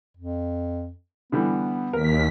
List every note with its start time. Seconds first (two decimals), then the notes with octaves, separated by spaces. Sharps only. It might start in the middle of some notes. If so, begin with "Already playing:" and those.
0.17 F2
1.32 D3 E3 G3 B3
1.93 D#2 A#4 B6